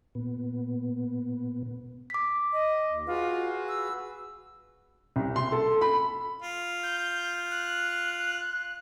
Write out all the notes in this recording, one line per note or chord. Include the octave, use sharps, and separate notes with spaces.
A#2 B3
D6 B6
D#5
D#2
F4 F#4 G#4 B4
E6
C2
C6
A4
B5
F4
G6
F#6